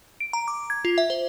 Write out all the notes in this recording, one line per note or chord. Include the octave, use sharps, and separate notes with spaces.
D7
A#5
D6
G#6
F4
E5
C5